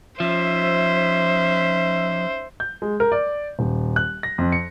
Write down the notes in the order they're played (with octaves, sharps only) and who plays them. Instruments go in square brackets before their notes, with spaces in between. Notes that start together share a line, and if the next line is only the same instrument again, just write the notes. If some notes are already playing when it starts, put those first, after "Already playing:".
[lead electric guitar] F3 [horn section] C#4 D#4 E5 [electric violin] C5
[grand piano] G6
G#3
A#4
D5
D#1
F#6
A#6
F2
C#7